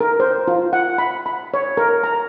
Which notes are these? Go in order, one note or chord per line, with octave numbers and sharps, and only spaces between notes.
A#4
C5
F4
F#5
B5
B5
C#5
A#4
A#5